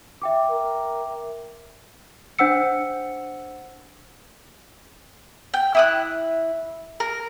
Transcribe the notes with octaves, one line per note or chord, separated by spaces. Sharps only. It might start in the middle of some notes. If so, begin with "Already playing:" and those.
E5 G5 D6
A#4
D4 C5 F#5 E6 C#7
G5
E4 D#6 F#6
A#4